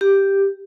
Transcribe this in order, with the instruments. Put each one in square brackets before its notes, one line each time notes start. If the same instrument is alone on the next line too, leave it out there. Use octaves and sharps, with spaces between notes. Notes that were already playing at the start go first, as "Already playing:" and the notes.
[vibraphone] G4